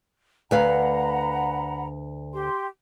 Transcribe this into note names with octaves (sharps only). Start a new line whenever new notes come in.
D2 B4 F5 F#5 A#5 B5
G4 C6